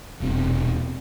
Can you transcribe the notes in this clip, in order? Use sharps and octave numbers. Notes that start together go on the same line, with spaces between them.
D#1 E2 B2 C4